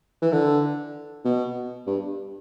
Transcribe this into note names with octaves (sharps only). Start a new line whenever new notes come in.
E3
D3
B2
G2